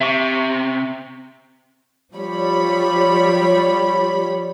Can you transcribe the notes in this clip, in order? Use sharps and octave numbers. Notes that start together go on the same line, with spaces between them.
C3 E5 C#6
F3 G3 C#5 B5